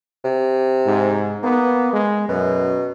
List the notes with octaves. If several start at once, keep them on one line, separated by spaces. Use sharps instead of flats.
C3
G#2
A#3 B3
G#3
F#2 B2